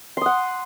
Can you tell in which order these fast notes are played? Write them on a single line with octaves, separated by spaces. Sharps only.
C6 D#6 F#5